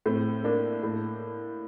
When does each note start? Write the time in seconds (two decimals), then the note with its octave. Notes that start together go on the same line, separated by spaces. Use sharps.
0.06 A2 A3 C4
0.44 A#3 D4
0.83 A2